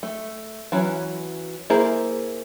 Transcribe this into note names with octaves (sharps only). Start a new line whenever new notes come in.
A3
E3 F#3 C#4
A#3 E4 G#4 C5 A#5